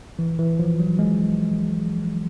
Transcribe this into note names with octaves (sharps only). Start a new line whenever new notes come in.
E3
E3
F3
F#3
G#3